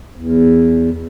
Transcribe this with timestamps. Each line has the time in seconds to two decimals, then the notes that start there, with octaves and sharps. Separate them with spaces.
0.16 E2